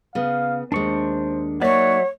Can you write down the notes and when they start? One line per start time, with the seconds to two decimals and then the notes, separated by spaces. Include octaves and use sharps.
0.15 C#3 B3 F5
0.72 D#2 G#3 D4 C5 C#6
1.62 F#3 A#3 D#4 C#5 D5 E5 F#5